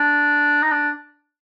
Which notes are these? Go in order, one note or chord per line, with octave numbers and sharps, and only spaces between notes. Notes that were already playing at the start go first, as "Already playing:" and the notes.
Already playing: D4
D#4
D4